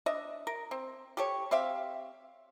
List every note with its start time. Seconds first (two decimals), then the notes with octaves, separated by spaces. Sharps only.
0.06 D4 D#5 E5
0.47 A#4
0.71 C4
1.17 G4 A4 C#5
1.51 C4 G4 E5 F5